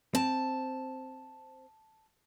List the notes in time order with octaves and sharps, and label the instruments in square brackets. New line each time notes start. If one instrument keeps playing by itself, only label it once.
[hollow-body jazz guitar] C4 [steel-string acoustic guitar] A5